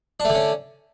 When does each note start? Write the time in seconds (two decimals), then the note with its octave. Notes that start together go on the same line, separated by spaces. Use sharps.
0.20 D4
0.25 A3
0.30 D3
0.35 C#4